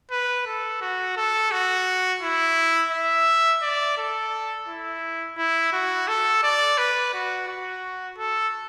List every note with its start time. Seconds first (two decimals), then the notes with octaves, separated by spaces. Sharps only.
0.11 B4
0.47 A4
0.81 F#4
1.17 A4
1.52 F#4
2.22 E4
2.92 E5
3.62 D5
3.97 A4
4.68 E4
5.37 E4
5.73 F#4
6.08 A4
6.43 D5
6.78 B4
7.13 F#4
7.48 F#4
8.18 A4